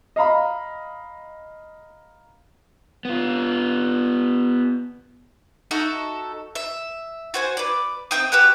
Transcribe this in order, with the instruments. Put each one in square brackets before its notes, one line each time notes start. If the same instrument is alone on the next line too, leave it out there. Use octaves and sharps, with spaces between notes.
[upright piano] D#5 F5 A#5 B5
[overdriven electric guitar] B3 F4
[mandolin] D#4 F#4 A4 E5
E5
F#4 C5 G#5
B4 D5
C4 E5 G5 D#6
F#4 G4 B4 F#5